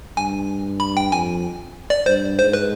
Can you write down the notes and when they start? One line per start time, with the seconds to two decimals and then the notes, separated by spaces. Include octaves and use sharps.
0.17 G2 G#5
0.80 B5
0.97 G5
1.12 F2 G#5
1.90 D5
2.06 G2 C5
2.38 G#2 C5
2.53 B4